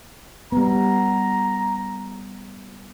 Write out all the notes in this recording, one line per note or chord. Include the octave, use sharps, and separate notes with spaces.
G3 B3 A#5